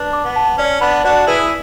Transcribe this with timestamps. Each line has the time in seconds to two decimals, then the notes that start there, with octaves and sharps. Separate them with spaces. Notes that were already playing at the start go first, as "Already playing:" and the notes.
Already playing: D4 B4 D6
0.13 D6
0.24 B3
0.36 A5
0.58 C#4 D5
0.81 B3 D4 B5
1.04 D4 F#4 D5
1.27 E4 G#4 B4